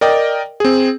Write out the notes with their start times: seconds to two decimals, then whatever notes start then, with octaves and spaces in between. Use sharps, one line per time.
0.01 A#4 D5 D#5 G5
0.60 C4 G#4